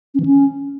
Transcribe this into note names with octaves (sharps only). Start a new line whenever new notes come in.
C#4
E3
C#4